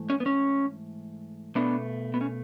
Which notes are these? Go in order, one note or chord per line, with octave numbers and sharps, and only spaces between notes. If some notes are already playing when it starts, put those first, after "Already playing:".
Already playing: G#2 E3 A3
C#4
B3
C#4
B2 A3 B3 D4
B3
C#4